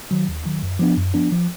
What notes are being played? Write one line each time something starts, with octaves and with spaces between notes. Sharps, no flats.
D#3 F#3
D#2
D#3 F#3
F#2
F3 B3 D4
F#2
F3 B3 D4
F3